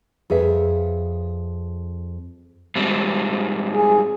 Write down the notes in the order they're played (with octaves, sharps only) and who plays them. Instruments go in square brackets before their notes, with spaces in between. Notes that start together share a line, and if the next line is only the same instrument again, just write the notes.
[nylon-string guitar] F2 G#4 B4 E5
[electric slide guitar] G#2 G3 C4
[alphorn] G#4